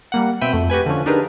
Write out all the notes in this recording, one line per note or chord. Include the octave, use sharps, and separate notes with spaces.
G3 A#3 F#5
B2 C4 E5 G5 B5 D#7
F2 A3
F#4 G4 B4 G#5
D3 F3 C#4
D4 D#4 G4 G#4 A#4 B4